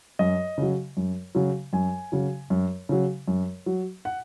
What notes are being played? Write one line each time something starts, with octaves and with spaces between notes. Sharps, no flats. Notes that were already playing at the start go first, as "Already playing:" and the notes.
F#2 D#5
C#3 F#3
F#2
C#3 F#3
F#2 G#5
C#3 F#3
F#2
C#3 F#3
F#2
F#3
F#5